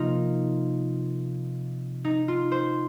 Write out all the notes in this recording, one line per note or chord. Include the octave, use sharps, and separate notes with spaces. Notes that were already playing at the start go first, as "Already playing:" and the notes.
Already playing: C3 F3 A#3 D#4 F4
D#4
F4
C5